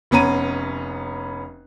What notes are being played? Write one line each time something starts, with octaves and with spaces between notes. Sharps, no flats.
F1 B3 C#4 A#5 D#7